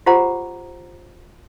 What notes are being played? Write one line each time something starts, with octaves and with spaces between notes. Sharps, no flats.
F4 G4 C5 F#5 A#5 D6